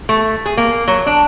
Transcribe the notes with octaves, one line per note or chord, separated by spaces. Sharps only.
A3
G#4
A#3
F#3
D4